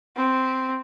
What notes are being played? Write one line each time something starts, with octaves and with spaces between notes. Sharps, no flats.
C4